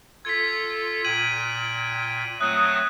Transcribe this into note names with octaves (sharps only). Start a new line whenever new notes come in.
F4 A4 G#6 B6
A#2 G5 G#6 D#7 F#7
F#3 A3 C4 D#6 F#6